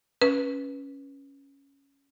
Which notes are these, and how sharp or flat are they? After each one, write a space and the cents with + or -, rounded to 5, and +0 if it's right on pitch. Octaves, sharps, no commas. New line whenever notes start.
C#4 +0 B4 -15